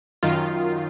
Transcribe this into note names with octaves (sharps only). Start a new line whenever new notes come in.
F#2 D#3 F4